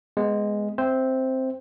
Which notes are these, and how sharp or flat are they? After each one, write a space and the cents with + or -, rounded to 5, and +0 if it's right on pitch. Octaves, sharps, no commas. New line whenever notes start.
G#3 +0 B3 +0
C4 +0 C5 +0 E5 +0